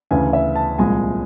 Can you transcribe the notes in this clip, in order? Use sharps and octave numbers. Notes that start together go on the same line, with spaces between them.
D2 C#3 E3 G#5
E5
A5
C2 A#2 F3 G#3 G#5